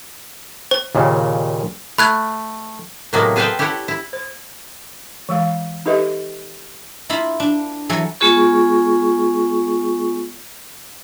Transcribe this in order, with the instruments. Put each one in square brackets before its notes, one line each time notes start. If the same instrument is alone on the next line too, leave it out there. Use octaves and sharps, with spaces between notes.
[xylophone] C5
[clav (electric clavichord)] D#2 A#2 C#3
[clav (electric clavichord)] A3 [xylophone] B5 F#6 G#6
[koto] A2 C3 F#3 G#3 A#3 B3
G#4 A4 B4 C5 F5 G5
E4 G4 A4 C#5 F#5
E4
[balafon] C5
E3 G#3 F5
D#4 G4 A4 B4 D#5 E5
[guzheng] A#3 E4 F4 B5
D4
E3 F#3 A4 G#5
[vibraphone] G#3 B3 F4 G#4 C#6